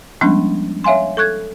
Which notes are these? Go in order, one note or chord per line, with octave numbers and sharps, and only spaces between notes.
F3 G3 G#3 B3 C#4 D4
C#5 E5 F5 G#5 C6
A4 C#6 F#6 G#6